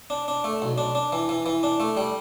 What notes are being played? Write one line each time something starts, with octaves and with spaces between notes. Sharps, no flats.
D4
D4
A3
B1
D4
D4
E3
E3
E3
D4
A3
G3